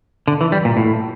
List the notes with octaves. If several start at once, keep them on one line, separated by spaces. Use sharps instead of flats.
D3
E3
G3
A#2
A2